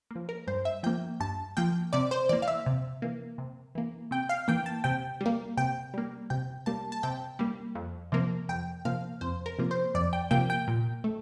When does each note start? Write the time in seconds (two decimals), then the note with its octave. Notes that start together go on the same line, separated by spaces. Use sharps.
0.11 F3 A#3
0.29 A#4
0.47 G2 C5
0.65 E5
0.83 F3 A#3 G5
1.20 G2 A5
1.57 F3 A#3 G5
1.93 C3 D5
2.11 C5
2.29 E3 A#3 D5
2.42 F5
2.48 E5
2.66 C3
3.02 E3 A#3
3.38 C3
3.75 E3 A#3
4.11 C3 G5
4.29 F5
4.48 E3 A#3 G5
4.66 A5
4.84 C3 G5
5.21 G3 A#3
5.57 C3 G5
5.94 G3 A#3
6.30 C3 G5
6.66 G3 A#3 A5
6.92 A5
7.03 C3 G5
7.39 G3 A#3
7.75 F2
8.12 C3 F3 A#3
8.49 F2 G5
8.85 C3 F3 A#3 F5
9.21 F2 C5
9.46 A#4
9.59 C3 F3 A#3
9.71 C5
9.95 F2 D5
10.13 G5
10.31 C3 F3 A#3 G5
10.50 G5
10.68 A#2
11.04 A3